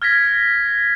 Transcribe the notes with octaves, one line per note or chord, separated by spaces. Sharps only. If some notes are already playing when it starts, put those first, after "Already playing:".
F6 G#6 A#6 B6